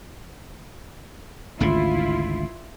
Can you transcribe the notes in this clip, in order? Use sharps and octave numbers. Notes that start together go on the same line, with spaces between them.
G#1 D2 C#3 E4 F4